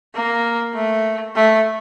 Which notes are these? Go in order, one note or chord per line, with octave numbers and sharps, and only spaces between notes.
A#3
A3
A3